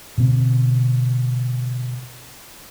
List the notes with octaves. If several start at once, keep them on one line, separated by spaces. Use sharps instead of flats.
B2 D3 C4